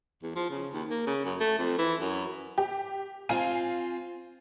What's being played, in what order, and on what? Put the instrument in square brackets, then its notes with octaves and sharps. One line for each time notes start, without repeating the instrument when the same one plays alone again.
[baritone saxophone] E2
F3
C#3
D#2
A#3
C#3
F#2
A3
F2
E3
F#2
[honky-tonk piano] G4
[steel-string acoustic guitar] C4 F4 [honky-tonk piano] F5 G#5 D#7